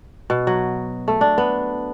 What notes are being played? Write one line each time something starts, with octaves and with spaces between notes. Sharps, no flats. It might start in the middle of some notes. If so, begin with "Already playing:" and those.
B2
F#3
A3
D4
B3